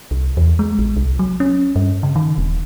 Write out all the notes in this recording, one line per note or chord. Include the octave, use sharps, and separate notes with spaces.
C2
E2
G#3
A1
C2
F#3
C#4
G2
C#3
D#3
D#1